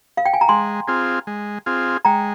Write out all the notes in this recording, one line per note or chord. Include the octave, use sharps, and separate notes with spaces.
F5
G5
G#5
A#5
G#3 G#5 C6
C4 F4 G#4
G#3
C4 F4 G#4
G#3 G5 A#5